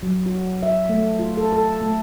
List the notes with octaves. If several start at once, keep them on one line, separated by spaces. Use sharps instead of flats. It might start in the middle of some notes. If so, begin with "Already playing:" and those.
F#3
F#4
E5
A3
F4
A4
A4
A3